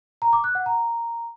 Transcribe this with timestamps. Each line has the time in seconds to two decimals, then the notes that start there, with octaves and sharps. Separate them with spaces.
0.22 A#5
0.33 D6
0.44 F#6
0.55 F#5
0.66 A#5